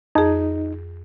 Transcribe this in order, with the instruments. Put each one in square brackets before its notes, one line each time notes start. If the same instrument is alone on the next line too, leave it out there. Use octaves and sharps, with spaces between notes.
[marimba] F2 G#4 [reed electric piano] D#4